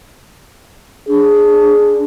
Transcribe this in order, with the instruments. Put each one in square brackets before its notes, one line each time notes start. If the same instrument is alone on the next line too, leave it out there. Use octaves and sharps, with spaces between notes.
[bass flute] D4 [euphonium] G#4